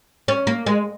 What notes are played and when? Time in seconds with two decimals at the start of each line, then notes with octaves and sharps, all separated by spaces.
0.28 C#4
0.47 A#3
0.66 G#3